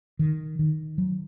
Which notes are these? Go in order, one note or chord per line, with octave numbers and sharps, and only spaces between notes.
D#3
D#3
F#3